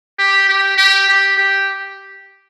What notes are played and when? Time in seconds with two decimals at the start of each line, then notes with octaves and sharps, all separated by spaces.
0.19 G4
0.49 G4
0.78 G4
1.08 G4
1.38 G4